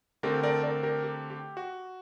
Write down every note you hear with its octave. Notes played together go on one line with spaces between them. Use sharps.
D3 A3 C4 G4 A#4
A#4 D5
A#4 D5
G4 A#4
G4
G4
F#4